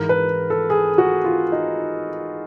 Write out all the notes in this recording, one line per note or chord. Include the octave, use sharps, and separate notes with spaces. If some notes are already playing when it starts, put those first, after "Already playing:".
Already playing: G#2 E3 A#4
B4
A4
G#4
F#4
F4
D#4